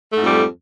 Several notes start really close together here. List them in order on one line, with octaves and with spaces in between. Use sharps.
A3 G#2 F2 G3